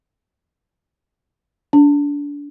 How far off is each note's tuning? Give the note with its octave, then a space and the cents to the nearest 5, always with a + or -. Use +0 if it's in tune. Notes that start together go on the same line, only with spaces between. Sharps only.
D4 -30